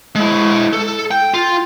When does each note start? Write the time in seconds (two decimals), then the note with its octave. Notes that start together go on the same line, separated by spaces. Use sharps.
0.15 G#3 E4
0.73 A4
1.11 G5
1.34 F4